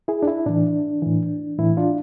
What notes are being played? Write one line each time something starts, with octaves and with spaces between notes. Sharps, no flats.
E4 G#4
D4
E4
A2 E3 D4
A2 E3
A2 E3 E4
D4 F4